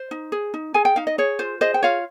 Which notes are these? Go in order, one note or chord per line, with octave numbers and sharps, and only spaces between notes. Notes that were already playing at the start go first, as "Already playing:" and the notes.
Already playing: C5
D#4
G#4
D#4
G#4 G#5
G5
D#4 F5
D#5
G#4 C#5
F4 C5
G#4 C5 D#5
G5
F4 C#5 F5